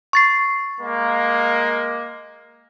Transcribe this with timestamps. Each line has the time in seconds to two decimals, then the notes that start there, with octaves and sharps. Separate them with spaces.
0.13 C#6 A6 C7
0.80 G#3 A#3